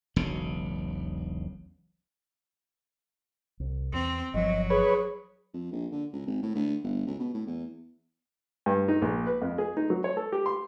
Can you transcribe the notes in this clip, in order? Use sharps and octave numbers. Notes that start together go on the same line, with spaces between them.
E1 B1 C#3
C2
E2 C4
G1 F3 F#3 D#5
G#4 B4 C#5
F2
A#1
D3
C#2
G#1
A2
D2
G1
C#2
B2
A2
E2
G2
D#4
A#1
B4
F2
G#4
D#4
F#3
C#5
A4
G4
C6